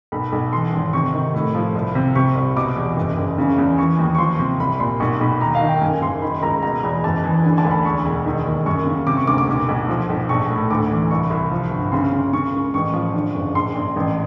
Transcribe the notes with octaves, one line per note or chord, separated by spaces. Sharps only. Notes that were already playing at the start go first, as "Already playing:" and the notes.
B1 B5
B1
E3 C6
G#1
C3 C#6
D#3
A2
F3
C2
C3
C3 C#6
C2
B2 D6
E2
F#1
F#1
C#3
E2
E3 C#6
D#2
C#6
F3 C6
C3
C2 B5
A#2 C6
B1 C#6
B1 B5
D#2 A#5
F5
D#3
G5
F#2 G#5
F#1 C6
D#3 B5
C#2 A#5
B2 A#5
E2
F#1 A5
E3
D3 G#5
A5
D2
B5
E2 C#6
E1
D#3
D#2
F#2 C#6
C#3
C3 D6
C#6
D2 D6
D6
B1
B1
F3
B1
A#1 C#6
A2
D2 D6
E3
C2 C#6
C2
F3
G1
C#3 C6
C#3
C#3 C#6
C#2
A1 C#6
F3
D3
F#1
A#1 C6
A#1
A1